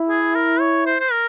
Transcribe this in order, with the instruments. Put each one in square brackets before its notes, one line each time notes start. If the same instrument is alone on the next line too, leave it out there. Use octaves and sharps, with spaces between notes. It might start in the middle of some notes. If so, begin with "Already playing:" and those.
Already playing: [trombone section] E4
[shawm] G#4
A#4
C#5
C5
C5
A#4